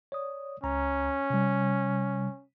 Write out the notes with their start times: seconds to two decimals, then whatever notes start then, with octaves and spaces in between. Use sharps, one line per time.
0.12 C#5 D5 D#6
0.64 C#2 C#4 A#5
1.30 C3 G3